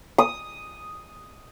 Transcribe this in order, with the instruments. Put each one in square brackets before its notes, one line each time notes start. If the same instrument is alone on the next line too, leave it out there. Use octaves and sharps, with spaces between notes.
[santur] D#6